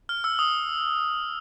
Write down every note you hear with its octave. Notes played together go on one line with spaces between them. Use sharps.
F6
E6
D#6